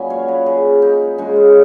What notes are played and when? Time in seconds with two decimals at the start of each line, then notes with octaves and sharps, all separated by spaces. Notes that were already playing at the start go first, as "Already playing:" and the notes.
Already playing: A#2 F#3 C#4 B4 D#5 G#5
0.10 C#5 F5
0.28 B4 D#5
0.46 G#4 B4
0.82 D#4
1.18 C#3 G#3 C#4 D#4
1.36 F4